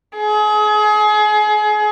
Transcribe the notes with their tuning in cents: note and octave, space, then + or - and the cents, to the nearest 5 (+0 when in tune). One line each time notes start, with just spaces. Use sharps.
G#4 +30